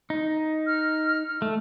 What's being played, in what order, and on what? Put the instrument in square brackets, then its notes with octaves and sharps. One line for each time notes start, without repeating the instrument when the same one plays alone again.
[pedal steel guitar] D#4
[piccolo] F6
[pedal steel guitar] A3